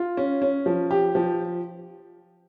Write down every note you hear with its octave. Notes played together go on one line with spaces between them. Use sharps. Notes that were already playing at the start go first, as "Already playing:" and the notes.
Already playing: F4
C#4
C#4
F3
G4
F3